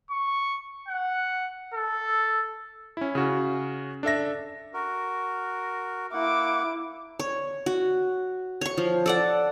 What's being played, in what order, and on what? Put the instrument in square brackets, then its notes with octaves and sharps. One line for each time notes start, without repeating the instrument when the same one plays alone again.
[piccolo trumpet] C#6
F#5
A4
[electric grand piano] C#4 E4
C#3 C#4 F#4
D4 A4 E5 A#6
[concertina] F#4 A#4
[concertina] A#3 F#5 [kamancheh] E4 D6
[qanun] C#5
F#4
C#5 C#6
F3
A4 D5 F#5